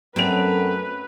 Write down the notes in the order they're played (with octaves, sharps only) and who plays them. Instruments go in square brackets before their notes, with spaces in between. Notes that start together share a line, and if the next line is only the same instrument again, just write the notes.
[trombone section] F#2 [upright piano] F#3 D7 F7 [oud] A3 C4 [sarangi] B4